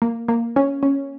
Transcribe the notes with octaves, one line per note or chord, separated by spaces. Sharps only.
A#3
A#3
C#4
C#4